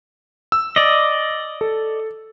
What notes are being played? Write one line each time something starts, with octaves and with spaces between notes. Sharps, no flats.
E6
D5 D#5
A4